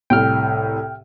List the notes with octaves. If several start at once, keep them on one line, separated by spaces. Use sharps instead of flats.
C2 A2 G5 F6